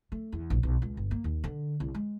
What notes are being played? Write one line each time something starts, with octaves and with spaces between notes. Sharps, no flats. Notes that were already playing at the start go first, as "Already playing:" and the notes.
A3
E2
A#1
B1
C#2
G1
A#3
D#2
D3
C2
G#3